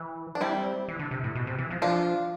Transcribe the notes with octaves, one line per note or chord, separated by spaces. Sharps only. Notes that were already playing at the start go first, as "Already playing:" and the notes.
Already playing: E3
D4
G3 C4 E4
E3
D3
C3
A2
B2
C3
E3
F3
F3 D4 F4